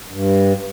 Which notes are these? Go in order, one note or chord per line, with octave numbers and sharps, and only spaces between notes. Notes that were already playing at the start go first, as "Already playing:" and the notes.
G2